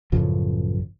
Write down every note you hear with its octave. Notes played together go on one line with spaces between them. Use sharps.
A1 F#2 C#3 F3